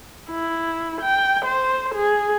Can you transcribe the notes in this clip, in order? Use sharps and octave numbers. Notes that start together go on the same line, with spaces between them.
E4
G5
C5
G#4